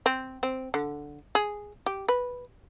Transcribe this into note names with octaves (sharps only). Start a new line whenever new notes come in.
C4
C4
D3
G#4
G4
B4